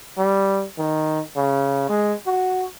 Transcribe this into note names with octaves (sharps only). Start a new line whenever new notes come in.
G3
D#3
C#3
G#3
F#4